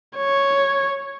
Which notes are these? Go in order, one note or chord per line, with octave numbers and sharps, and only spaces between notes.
C#5